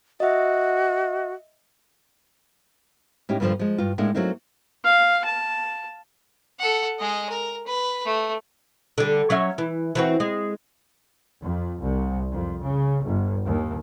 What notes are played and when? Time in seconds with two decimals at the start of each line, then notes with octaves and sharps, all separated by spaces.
0.20 F#4 D#5 E5
3.29 A2 C#4 D#4 G4
3.40 G2 A#2 D3 E3 F3 G3
3.59 F3 G#3
3.78 G2 F4
3.98 A2 G#3 A#3 D4 D#4
4.15 F#3 A3 A#3 C4 D#4
4.85 F5
5.25 A5
6.60 A4 F#5
6.99 G#3 D#5
7.30 A#4
7.67 B4
8.05 A3
8.98 D3 G3
9.30 F#3 C#4 E5
9.58 E3
9.95 E3 C4 F#4
10.20 G#3
11.42 F2
11.81 C2
12.32 F2
12.64 C#3
13.05 G1
13.45 D#2